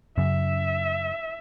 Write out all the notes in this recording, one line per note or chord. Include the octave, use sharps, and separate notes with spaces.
F#2 C#3 E5